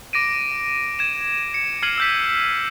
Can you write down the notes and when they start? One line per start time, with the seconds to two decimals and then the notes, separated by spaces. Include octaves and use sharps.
0.13 D6 A#6 D7 D#7
0.99 G#6 E7
1.54 C#7
1.83 F6 G#6 C7 C#7 D#7 F#7
1.98 E6 G6 B6